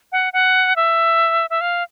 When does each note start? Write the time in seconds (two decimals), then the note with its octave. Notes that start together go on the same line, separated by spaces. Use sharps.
0.12 F#5
0.33 F#5
0.76 E5
1.50 E5
1.61 F5